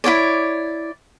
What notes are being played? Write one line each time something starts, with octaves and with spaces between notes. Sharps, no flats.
E4 F4 C#5 D5